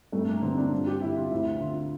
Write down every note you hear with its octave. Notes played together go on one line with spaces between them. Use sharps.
G2 A3
A#3
D3 C4
D4
G2 F4
G4
D3 E4
F4
D2 E4
D3 F4